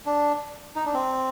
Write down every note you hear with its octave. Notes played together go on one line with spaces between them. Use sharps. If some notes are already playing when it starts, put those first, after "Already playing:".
D4
D#4
D4
C4